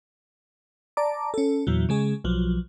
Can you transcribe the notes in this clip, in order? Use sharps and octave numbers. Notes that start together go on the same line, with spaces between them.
D5 A5 A#5 D6
C#4 A4
E2 A#2 E3 F#3
C#3 G#3 G#4
B1 F3 F#3